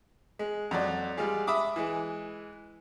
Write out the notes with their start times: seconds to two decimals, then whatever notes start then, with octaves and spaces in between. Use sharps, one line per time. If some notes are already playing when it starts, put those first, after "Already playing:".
0.39 G#3
0.71 F2 F#3 D5
1.17 G3 G#3 F4 G4 G#4
1.47 E5 B5 D6 D#6
1.76 E3 G#3